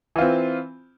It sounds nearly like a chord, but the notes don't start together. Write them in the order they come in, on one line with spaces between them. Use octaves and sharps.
E3 F4 C4